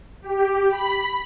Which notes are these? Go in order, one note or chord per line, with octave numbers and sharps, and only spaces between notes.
G4
B5